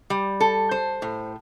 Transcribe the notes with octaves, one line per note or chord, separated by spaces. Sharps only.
G3
A4
C5
A2